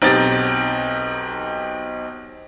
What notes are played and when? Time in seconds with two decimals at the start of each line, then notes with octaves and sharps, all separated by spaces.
0.02 B1 C4 D#4 G4 D#5 A6